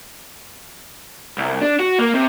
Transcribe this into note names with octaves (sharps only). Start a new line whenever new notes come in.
C2
D4
F#4
A#3
C3